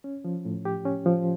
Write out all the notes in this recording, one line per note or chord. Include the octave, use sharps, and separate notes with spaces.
C#4
F3
A2
G4
C#4
F3